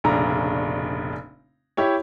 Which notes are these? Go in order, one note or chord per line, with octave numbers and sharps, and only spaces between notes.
F1 A#1 C#3 D4 A#5
E4 G4 C#5